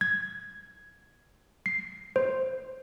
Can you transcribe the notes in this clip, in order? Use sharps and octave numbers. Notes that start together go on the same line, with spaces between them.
G#6
C7
C5